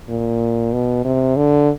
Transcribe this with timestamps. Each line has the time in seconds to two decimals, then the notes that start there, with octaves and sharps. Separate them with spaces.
0.09 A#2
0.73 B2
1.05 C3
1.37 D3